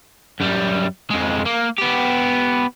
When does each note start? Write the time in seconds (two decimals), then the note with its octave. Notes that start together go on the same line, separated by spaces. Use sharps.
0.40 F#2 G3
1.10 F2 G#3
1.46 A#3
1.79 B3 G4